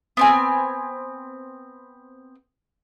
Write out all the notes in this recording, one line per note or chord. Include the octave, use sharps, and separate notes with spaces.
B3 C4 G#5